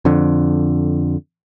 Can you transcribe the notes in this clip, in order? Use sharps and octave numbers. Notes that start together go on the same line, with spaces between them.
F2 D3